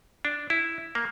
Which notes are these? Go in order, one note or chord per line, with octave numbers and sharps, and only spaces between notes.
D4
E4
A#3